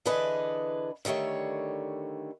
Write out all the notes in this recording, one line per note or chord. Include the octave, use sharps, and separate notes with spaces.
D3 E3 D4 G#4 B4 D#5
D3 D#3 G3 A3 C#5